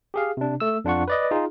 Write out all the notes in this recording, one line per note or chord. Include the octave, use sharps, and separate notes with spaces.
G4 G#4 F5
C3 D4
A3 E6
F2 D4 F4 F#5 C#6
B4 D5 D#5
D#4 F4 G#4